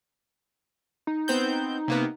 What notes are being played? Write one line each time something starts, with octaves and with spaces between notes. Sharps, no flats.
D#4
B3 C4 G6
C3 A#3 B3